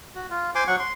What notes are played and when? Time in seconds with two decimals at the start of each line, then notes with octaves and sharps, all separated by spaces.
0.15 F#4
0.30 F4
0.55 C5 G#5 C6 D6
0.67 F#3 F#5 C#6
0.79 C6